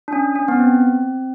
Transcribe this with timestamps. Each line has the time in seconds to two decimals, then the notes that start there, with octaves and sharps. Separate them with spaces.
0.08 D4
0.13 C#4
0.36 C#4
0.48 B3
0.59 C4